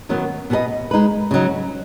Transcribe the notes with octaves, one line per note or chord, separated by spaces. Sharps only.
F#2 D#3 F#3 B3
B2 B3 G#4 B4 D#5
G#3 D#4 B4
C#3 F#3 D#4